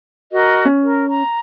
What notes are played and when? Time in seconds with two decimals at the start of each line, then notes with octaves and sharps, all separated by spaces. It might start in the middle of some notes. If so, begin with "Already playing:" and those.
0.32 F#4 A#4 D#5
0.65 C#4
0.82 A#4
1.08 A#5